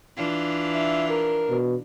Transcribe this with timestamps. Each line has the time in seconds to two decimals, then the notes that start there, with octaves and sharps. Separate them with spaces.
0.17 E3 D4 F4
0.74 E5
1.09 A#4
1.50 B2